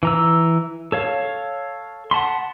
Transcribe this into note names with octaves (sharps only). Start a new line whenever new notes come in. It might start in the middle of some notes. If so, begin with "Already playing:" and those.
E3 A#5 E6
A4 C#5 F5
F#5 A5 B5 C6